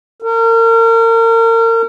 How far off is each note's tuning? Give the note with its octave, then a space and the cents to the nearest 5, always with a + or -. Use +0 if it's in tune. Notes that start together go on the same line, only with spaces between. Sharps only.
A#4 -35